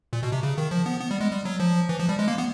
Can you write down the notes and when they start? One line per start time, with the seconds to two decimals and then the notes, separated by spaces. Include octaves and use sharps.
0.13 A#2
0.23 B2
0.32 C3
0.43 C#3
0.58 D#3
0.71 F3
0.86 B3
1.01 B3
1.11 G3
1.20 G#3
1.31 G3
1.45 F#3
1.60 F3
1.89 E3
2.00 F3
2.09 G3
2.19 G#3
2.28 A#3
2.38 B3